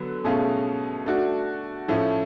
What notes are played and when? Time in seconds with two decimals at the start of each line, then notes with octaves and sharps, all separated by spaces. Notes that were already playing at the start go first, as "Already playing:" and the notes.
Already playing: D3 F#3 B3
0.24 B2 A3 C#4 F4 G#4
1.06 A3 D4 F#4
1.88 A2 F3 A3 C#4